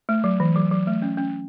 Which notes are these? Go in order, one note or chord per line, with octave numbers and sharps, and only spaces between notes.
A3
F#3
E3
F#3
F#3
A3
C#4
C#4